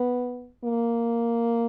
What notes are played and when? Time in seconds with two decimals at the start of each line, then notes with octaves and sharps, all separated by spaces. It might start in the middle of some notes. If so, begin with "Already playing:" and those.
Already playing: B3
0.64 A#3